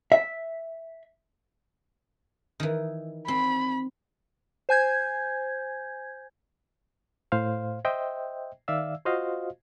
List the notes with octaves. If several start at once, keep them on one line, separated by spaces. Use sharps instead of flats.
E5
D#3 E3
C4 B5
C5 G#5 G6 G#6
A2 C5 F5
C5 D#5 E5 G5
D#3 D5 E5 F5 E6
F4 F#4 C5 D#5 F5